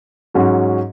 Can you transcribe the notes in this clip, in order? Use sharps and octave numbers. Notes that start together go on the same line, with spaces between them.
G#2 F#3 C#4 F#4